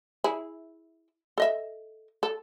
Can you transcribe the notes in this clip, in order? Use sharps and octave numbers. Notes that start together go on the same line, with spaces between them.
E4 G#4
A4 D#5 E5
A4